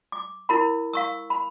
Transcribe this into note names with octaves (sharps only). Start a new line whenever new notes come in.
D6
E4 A#4 B5
F5 C#6 E6
B5